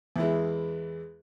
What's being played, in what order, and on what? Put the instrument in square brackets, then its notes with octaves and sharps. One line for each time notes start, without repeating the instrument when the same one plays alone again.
[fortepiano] E2 E3 G#3